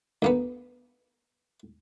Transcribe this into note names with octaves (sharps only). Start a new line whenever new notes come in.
D2 A#3 B3